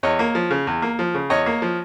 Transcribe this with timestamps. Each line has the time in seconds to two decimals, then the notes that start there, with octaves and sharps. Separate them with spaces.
0.03 E2 C#5 D#5
0.19 A#3
0.35 F3
0.51 C#3
0.67 E2
0.82 A#3
0.99 F3
1.14 C#3
1.30 E2 C#5 D#5
1.46 A#3
1.62 F3